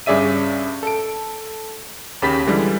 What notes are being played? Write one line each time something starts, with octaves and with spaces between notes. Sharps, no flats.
G2 C#3 G#4 D5 E5 D#7
A4 D7
D#2 C#3 G4 B5 A6 B6
D3 E3 G3 G#3